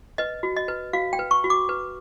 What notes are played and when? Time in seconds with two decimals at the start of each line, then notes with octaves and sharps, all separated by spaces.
0.18 B4 D#5
0.43 F#4
0.56 D#5
0.68 B4
0.93 F#4 F5
1.13 G5
1.19 B4
1.31 C#6
1.44 F#4
1.50 D6
1.69 B4